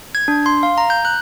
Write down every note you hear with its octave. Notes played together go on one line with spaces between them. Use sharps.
G#6
D4
C6
F5
A#5
G6
F#6